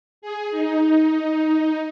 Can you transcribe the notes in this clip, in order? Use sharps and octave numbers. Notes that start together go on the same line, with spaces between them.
G#4
D#4